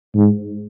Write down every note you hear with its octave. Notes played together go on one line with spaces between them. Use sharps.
G#2